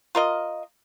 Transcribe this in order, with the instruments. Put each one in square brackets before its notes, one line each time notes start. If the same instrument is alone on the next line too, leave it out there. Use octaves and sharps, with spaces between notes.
[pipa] F4 A#4 D#5